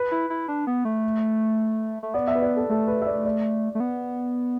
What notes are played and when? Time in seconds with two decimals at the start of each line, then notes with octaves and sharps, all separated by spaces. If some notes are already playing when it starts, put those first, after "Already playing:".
Already playing: B4
0.11 E4
0.30 E4
0.48 D4
0.67 B3
0.85 A3
2.03 A3
2.14 B3 D5
2.28 E5
2.35 B4
2.42 D5
2.56 A4
2.69 A3 A4
2.88 B4
3.02 E5
3.07 D5
3.25 D5
3.75 A3
3.80 B3